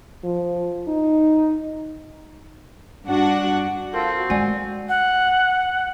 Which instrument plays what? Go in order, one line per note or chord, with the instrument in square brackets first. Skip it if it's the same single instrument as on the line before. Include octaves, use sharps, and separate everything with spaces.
[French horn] F3
D#4
[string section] G2 D4 F#4 F#5
[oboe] C4 [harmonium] F4 A4 [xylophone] A#4
[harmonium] F#4
[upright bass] G#3 [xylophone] D5 F#5 G#5
[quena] F#5